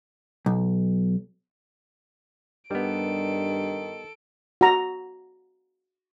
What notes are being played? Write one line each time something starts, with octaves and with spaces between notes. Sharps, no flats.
B1
G2 D#3 G3 B3 A4 D7
F#4 A#5